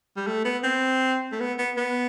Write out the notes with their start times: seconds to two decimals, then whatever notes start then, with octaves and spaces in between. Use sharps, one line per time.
0.17 G3
0.27 A3
0.45 B3
0.64 C4
1.32 A3
1.40 B3
1.59 B3
1.77 B3